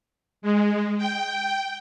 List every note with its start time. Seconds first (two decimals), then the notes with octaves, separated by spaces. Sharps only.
0.42 G#3
0.97 G5